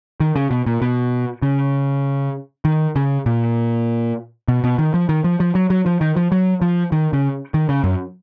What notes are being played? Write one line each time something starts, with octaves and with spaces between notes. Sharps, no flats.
D#3
C#3
B2
A#2
B2
C#3
D#3
C#3
A#2
B2
B2
D#3
F3
D#3
F3
F3
F#3
F#3
F3
D#3
F3
F#3
F3
D#3
C#3
D#3
C#3
F#2